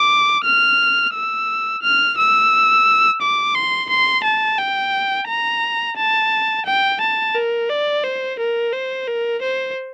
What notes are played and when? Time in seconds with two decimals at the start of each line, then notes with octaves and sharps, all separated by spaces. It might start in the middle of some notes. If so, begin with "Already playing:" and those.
Already playing: D6
0.45 F6
1.14 E6
1.83 F6
2.18 E6
3.21 D6
3.55 C6
3.90 C6
4.24 A5
4.59 G5
5.28 A#5
5.98 A5
6.66 G5
7.01 A5
7.35 A#4
7.69 D5
8.04 C5
8.39 A#4
8.73 C5
9.07 A#4
9.42 C5